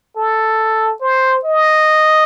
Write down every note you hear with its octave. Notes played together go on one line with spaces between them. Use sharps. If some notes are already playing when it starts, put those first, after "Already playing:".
A4
C5
D#5